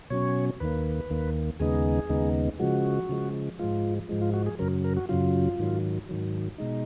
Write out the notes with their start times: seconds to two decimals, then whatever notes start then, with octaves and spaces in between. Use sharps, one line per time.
0.10 B2 F#3 C#4 C#5
0.60 D#2 D#3 A#3 B4
1.10 D#2 D#3 A#3
1.60 D#2 C#3 G#3 B3 D#4 G#4
2.09 D#2 C#3 G#3 B3 D#4
2.60 C#3 F3 G#3 F#4
3.09 C#3 F3 G#3
3.59 G#2 F3 G#3 F4
4.09 G#2 F3 G#3
4.21 F4
4.34 F#4
4.46 G#4
4.59 F#2 C#3 F#3 A#4
4.84 A#4
4.97 F#4
5.09 F#2 C#3 F#3 F4
5.59 G#2 D#3 F#3
6.09 G#2 D#3 F#3
6.58 B2 G#3 D#4